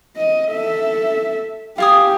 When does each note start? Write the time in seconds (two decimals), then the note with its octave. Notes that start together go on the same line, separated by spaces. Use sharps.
0.17 D#5
0.52 A4 E5
1.78 F4 G4 G#5 D#6